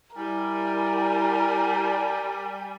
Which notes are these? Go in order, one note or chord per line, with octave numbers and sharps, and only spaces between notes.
G3 E4 A#4 G#5